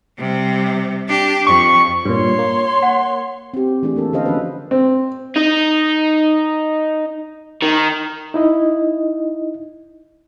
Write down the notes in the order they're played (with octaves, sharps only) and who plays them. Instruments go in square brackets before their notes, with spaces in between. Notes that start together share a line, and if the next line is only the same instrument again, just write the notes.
[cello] C3 G3
D4 G4
[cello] F2 [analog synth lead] C#6
[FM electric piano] G2 A#2 [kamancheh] C#5 C6
[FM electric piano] A#3
[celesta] F#5
[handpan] C4 G4
E3 A3 D4 G#4
E3 A#3 A4
D3 C#4 A4 C5 D#5 F5
F3 C#4 F#4 B4
[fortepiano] C4
[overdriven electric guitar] D#4
D#3
[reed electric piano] D#4 E4 D#5